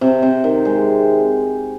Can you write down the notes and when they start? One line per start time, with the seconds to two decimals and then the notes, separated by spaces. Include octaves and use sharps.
0.01 C3
0.23 C3
0.44 D#3
0.65 G#3